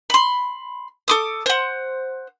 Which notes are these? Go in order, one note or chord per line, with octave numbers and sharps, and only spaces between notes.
B5 C6
A4 D6 D#6
C5 F#5